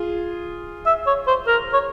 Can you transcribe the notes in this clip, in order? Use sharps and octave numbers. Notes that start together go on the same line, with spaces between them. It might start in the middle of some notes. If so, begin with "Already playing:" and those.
Already playing: F4 G#4
E5
C#5
C5
A#4
C#5